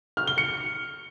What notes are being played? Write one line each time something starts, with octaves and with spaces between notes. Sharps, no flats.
F6
G7
C#7